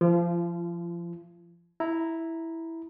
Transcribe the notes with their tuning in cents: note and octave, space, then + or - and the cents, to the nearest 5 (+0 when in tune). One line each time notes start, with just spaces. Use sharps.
F3 -20 F4 -40
E4 -5 A#5 +0